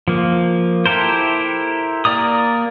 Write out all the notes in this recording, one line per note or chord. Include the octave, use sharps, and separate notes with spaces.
F3 A#3
E4 G4 A4 A#4 C5
A#3 D5 A#5 D#6